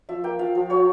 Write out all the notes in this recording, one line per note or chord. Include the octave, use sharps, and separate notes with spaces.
F3 E5
A#3 G5
F3 F5
F3
F3 C#5